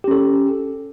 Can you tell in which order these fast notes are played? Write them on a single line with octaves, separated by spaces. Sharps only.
G4 C#4 A4